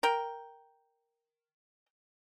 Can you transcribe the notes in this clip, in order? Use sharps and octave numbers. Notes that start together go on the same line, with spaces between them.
A#4 G5